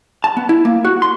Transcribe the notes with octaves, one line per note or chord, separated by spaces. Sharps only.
A5
B3
E4
A#3
F#4
C6